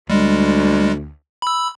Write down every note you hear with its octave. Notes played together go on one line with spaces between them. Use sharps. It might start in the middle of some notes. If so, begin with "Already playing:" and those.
D2 G3 G#3
B5 E6